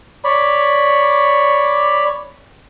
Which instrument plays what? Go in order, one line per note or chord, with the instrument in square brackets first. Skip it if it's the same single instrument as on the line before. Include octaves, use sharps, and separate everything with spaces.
[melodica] C#5 D5 B5